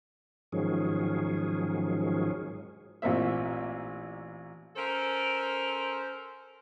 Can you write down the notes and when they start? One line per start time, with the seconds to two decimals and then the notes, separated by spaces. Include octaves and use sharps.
0.52 G#2 D#3 F3 F#3 C#4 G#4
3.02 A1 A#2 A#3 C4 E5
4.76 C#4 A4 A#4 C5